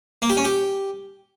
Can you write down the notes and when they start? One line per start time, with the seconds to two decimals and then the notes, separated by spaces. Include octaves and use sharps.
0.22 A#3
0.30 G4
0.37 C#4
0.44 G4